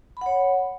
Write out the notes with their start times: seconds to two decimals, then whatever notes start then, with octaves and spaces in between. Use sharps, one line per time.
0.17 B5
0.21 F#5
0.26 C#5